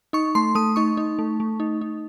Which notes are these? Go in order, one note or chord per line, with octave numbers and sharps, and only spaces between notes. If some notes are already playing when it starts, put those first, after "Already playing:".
D#4 C#6
A3 C6
A3 D#6
D#4 C#6
D#4
A3
A3
D#4
D#4